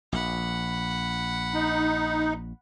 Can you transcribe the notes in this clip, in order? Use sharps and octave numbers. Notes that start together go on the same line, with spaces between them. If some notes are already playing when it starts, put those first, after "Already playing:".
A#1 F#5 B5
D#4